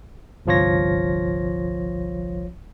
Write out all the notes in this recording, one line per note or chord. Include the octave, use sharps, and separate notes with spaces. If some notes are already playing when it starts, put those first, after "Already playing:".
G1 C2 F3 F4 C#5 A#6